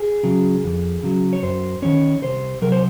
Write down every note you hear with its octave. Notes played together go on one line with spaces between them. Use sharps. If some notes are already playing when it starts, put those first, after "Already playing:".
Already playing: G#4
C#3 F#3
F2
C#3 F#3
C#5
F#2 C5
D#3 F#3 C#4 C#5
C2 C5
C3 F#3 A#4
C5